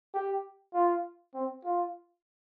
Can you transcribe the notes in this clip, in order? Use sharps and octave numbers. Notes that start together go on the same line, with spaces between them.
G4
F4
C4
F4